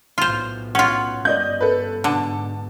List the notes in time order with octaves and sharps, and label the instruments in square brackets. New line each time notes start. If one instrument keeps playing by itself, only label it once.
[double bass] B1 A2 [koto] F4 C5
[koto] C#4 F4 [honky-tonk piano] F#5
[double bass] G1 G2 [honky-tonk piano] D5 D#5 G6
[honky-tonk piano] A4 B4
[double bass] G#2 B2 [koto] D3 [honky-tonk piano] A5